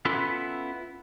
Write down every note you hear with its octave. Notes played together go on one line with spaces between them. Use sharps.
B3 C#4 E4 F4 A4 B4